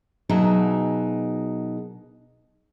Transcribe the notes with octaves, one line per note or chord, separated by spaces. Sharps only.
B2 F#3 D#4 G#4 A#4 E5